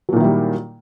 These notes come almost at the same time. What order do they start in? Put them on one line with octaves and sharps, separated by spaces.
F#3 A#2 D#3 E4 G3